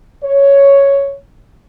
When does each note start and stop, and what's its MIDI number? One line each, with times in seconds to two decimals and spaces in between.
0.23 1.14 73